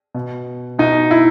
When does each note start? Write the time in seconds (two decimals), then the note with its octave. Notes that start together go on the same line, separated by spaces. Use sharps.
0.14 B2
0.79 B2 D#4
1.11 E4